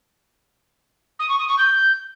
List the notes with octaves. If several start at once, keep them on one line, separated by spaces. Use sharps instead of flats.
D#6
C#6
D#6
C#6
G6